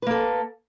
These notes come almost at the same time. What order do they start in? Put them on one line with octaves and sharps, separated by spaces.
B4 A#3 A4